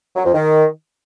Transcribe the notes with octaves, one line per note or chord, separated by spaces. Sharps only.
F#3
F2
D#3